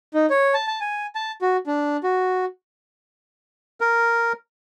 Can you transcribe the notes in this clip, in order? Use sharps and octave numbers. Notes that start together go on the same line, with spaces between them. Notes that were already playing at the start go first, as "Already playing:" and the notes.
D#4
C#5
A5
A5
G#5
A5
F#4
D4
F#4
A#4